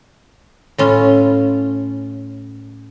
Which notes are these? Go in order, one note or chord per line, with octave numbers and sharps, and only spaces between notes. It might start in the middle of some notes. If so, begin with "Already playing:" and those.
A2 C#4 F4